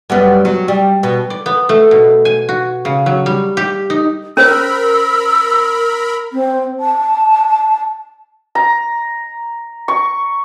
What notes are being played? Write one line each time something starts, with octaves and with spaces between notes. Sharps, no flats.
F#2 G3 B3
F#3
G3
B2
D5
B3
A3
B2
G#5
F#4
C#3
F#3
G3
G4
D#4
C#4 A#4 C5 B5 E6
C4
A5
A#5
C#6